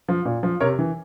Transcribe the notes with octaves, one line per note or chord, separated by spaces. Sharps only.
F3
A#2
F3
C3 A#4 C#5
E3